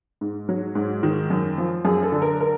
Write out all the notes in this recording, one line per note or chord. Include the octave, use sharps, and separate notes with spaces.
G#2
F#3
G#2
D#3
F#2
F3
F#2 G#4
A4
D3
A#4
A#4